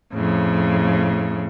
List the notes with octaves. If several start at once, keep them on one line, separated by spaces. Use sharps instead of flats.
F2 A2 C#3